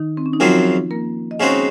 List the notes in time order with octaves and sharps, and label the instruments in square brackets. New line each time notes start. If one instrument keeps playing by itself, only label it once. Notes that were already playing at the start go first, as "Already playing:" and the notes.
Already playing: [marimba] D#3 D#4
C4
C#4
D#4
[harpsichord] F#2 C#3 F#3 C4 [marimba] F3 F4
[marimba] A#3 A#4
D#5
[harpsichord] C#3 G#3 C4 D#4 F#4 [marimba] C#4 C#5